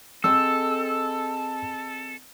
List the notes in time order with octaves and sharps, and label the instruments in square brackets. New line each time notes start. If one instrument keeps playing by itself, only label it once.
[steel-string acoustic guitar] C4 G#4 D#5 [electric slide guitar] A4 [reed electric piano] E6